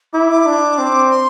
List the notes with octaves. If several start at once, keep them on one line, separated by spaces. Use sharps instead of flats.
E4 D6
D6
D4
C4
C6